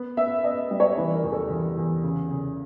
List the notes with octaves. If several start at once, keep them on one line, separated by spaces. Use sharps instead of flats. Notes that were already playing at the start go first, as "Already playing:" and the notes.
Already playing: B3
B3 E5
B3 D#5
G3
C#5
E3 B4
A#4
E2
A4
E2
E2
C#3
C#3